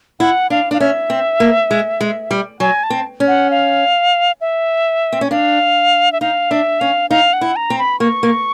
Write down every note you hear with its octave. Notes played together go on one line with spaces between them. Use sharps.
E4 F#5
D4 F5
D4 F5
C#4 E5
C4
A#3
G#3
G#3
G3
F#3 G#5
A5
C4
C#4
F#5
F5
E5
C4
C#4
D4 F5
E5
D#4 F5
D4 E5
C#4 F5
D#4 F5
F#5
E4
A#5
C4
B5
A#3 C#6
A#3